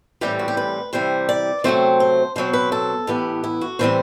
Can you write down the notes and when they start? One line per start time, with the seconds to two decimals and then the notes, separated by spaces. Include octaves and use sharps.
0.21 A2 E3 G3 C4 G4
0.39 F#4
0.48 G4
0.57 B4
0.93 C3 E3 G3 C5
1.29 D5
1.64 C3 F#3 A3 C4 C5
2.00 C5
2.36 B2 F#3 C4 C5
2.53 B4
2.72 A4
3.07 A2 E3 B3 G4
3.44 E4
3.61 F#4
3.79 A2 E3 G3 C4 C5